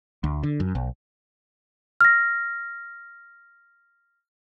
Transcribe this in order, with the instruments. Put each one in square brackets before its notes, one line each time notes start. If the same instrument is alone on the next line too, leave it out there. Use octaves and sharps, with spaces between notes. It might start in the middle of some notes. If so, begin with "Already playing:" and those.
[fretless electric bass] D2
D3
F#2
B1
[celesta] F6 A#6